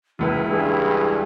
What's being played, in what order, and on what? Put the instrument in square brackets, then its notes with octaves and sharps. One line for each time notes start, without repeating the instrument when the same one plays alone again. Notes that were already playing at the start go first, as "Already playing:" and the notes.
[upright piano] E1 C#2 B4 [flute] E4
[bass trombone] G2 [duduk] G#4